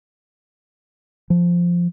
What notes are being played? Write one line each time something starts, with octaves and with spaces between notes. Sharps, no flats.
F3